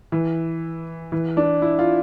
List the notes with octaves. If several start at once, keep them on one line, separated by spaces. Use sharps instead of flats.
E3
E3
D4
E4
F4